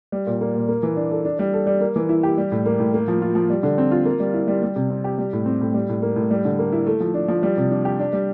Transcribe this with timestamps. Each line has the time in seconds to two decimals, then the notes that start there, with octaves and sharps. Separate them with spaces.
0.12 G3
0.27 A#2
0.41 A#3
0.55 A#2
0.68 A#3
0.83 E3
0.97 D4
1.11 A4
1.25 D4
1.39 G3
1.53 A4
1.67 G3
1.81 A#3
1.96 E3
2.09 E4
2.23 G4
2.38 G3
2.51 A2
2.66 A#3
2.79 A2
2.94 A#3
3.08 F3
3.22 F4
3.35 F3
3.50 G3
3.63 D3
3.78 C4
3.91 F4
4.05 A#3
4.20 G3
4.34 E4
4.48 G3
4.63 G3
4.76 C3
4.90 C4
5.04 G4
5.18 G3
5.33 A2
5.46 C4
5.61 A2
5.74 G3
5.89 A2
6.02 A#3
6.16 A2
6.31 G3
6.45 D3
6.59 A#3
6.72 E4
6.87 A3
7.00 F3
7.14 D4
7.28 F3
7.43 G3
7.57 C3
7.71 D4
7.85 G4
8.00 D4
8.13 G3